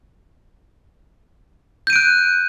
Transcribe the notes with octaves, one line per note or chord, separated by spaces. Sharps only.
F#6 G6 D7 D#7